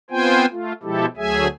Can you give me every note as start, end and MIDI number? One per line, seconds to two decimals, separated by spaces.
0.10 0.45 59
0.10 0.45 60
0.10 0.45 65
0.10 0.45 72
0.10 0.45 79
0.10 0.45 80
0.51 0.73 57
0.51 0.73 65
0.83 1.06 47
0.83 1.06 53
0.83 1.06 56
0.83 1.06 64
0.83 1.06 67
0.83 1.06 69
1.17 1.47 38
1.17 1.47 54
1.17 1.47 57
1.17 1.47 68
1.17 1.47 76
1.17 1.47 80